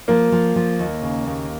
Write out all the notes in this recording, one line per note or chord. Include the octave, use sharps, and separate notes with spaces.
F3 A#3
F3
F3
D#2
C#3
D#2